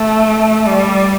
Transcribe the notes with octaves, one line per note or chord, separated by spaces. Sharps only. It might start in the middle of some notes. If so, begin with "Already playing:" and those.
Already playing: A3
G3